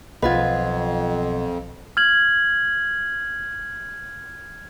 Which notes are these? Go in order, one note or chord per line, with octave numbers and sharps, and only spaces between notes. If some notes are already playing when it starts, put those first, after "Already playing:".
B1 F2 C4 F4 B4 D#5 F#5 G#6
F6 G#6 F#7